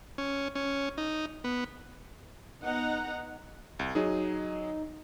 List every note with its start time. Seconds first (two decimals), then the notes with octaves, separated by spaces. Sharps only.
0.18 C#4
0.55 C#4
0.98 D#4
1.44 B3
2.63 B3 D#4 F#5 A#5
3.79 C2
3.95 F#3 D#4 G#4